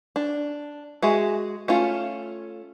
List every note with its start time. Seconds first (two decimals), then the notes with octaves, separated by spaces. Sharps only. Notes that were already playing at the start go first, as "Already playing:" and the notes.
0.16 D4
1.02 G#3 F#4 G#4 E5
1.68 A3 C#4 F4